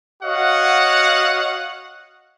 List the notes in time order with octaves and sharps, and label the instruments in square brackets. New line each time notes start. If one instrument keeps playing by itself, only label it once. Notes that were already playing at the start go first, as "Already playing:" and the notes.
[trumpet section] F#4 C#5 D#5 F5 F#5